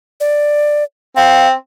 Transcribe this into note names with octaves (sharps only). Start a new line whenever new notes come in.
D5
C4 F5